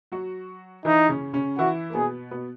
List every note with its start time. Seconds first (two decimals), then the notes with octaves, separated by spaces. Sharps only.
0.12 F#3 F#4
0.85 E3 D#4 E4
1.09 C#3 C#4
1.33 C#3 C#4
1.58 E3 E4 F#4
1.90 A#3
1.95 B2 B3 G#4
2.31 B2 B3